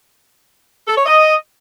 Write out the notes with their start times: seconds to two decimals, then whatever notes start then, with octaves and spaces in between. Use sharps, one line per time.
0.86 A4
0.95 C#5
1.04 D#5